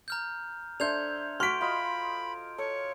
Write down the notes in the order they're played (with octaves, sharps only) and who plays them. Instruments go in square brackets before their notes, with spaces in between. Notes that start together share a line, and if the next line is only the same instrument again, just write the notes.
[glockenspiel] A#5 F6 G6
[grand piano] D4 [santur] A4 C5 E5 [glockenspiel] G6 G#6 F7
[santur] F#4 [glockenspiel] C6 D7 [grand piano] F6 B6
[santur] F4 D#5 [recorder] B5
[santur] A4 [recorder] C#5